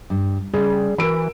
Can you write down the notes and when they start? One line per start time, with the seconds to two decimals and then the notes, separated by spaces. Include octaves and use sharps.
0.10 G2
0.54 C#3 G3 G#4
0.98 E3 F#4 A#4 B5 E6 D7